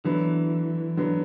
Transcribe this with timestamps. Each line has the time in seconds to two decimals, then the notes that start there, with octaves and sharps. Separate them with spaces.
0.04 D3 E3 F#3 B3
0.97 D3 F#3 B3